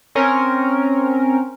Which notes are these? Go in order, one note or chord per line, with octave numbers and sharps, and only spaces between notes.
C4 C#4 A#4